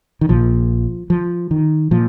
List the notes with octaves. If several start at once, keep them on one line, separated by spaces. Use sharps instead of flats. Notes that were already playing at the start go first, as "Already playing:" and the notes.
D#3
A#1 A#2 F3
F3
D#3
A#2 F3